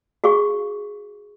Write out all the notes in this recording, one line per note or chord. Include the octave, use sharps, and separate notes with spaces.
F#4 G#4 F5 C#6